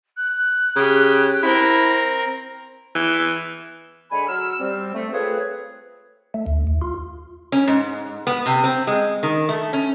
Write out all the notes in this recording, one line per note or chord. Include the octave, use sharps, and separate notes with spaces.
F#6
C#3 G4
C4 E4 A#4
E3
D3 G#3 C#5 G#5 B5
F#3 E6 F6
G3 C4
A3 C4
C4 F4 G#4 A4 B4 C#5
A3
D2
D#2
F4
C#4
G#2
B3
C3
C4
G#3
D#3
A3
C#4